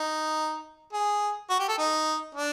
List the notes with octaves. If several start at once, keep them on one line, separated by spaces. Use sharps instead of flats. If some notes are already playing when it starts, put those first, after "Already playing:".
Already playing: D#4
G#4
F#4
G4
A4
D#4
D4